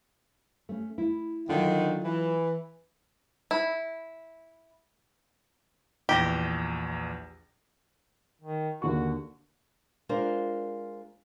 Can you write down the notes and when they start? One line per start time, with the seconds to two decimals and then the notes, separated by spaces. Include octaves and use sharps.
0.69 A3 C#4
0.98 E4
1.49 D3 D#3 F#3 F4
2.04 E3
3.51 E4
6.09 A#1 E2 G4 A#6
8.41 D#3
8.82 D#2 D3 F#4 C#6
10.09 G#3 D4 F4 A#4 C5